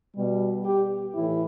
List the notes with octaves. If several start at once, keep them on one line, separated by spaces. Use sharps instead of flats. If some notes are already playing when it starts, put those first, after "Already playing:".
B2 G3
G4
A2 E3 E4